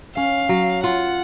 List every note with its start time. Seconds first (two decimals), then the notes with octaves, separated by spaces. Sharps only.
0.16 C#4 F5
0.49 F#3
0.84 F4 F#5